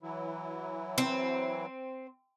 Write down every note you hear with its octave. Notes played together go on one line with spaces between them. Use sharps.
E3 F#3 E4
C4